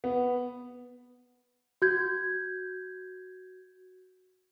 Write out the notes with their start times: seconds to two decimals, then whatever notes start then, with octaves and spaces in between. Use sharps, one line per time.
0.04 B3
1.82 F#4 G6 G#6